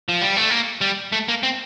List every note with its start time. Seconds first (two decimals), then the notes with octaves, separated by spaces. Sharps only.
0.09 F3
0.22 G3
0.37 A3
0.50 A#3
0.81 G3
1.12 A3
1.28 A#3
1.43 C4